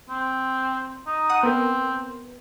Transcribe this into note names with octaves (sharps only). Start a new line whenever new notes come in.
C4
D#4
F#5 D#6
B3 C4 A#4